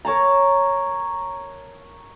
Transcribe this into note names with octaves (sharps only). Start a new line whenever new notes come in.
A#4 C#5 A5 A#5